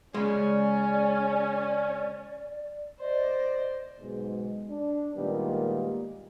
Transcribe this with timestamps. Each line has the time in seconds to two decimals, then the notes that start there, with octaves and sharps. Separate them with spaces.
0.14 C#3 G#3 C#4 D5
3.00 C5 D5 D#5
4.00 B1 G#2 B2 G#3
4.69 D4
5.16 A#2 D#3 G3 G#3 B3